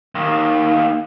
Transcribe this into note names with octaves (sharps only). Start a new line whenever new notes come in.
D#2 D#3